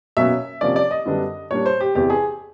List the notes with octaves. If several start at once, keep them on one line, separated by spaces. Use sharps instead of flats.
B2 F#3 A#3 C#4 E5
C3 F3 A#3 C#4 D5
D5
D#5
F#2 D3 G3 B3 D4
A#2 G3 A#3 D4 C#5
C5
G4
E2 C3 E3 G4
G#4